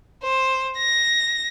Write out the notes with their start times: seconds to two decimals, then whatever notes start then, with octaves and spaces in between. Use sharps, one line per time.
0.23 C5
0.77 A#6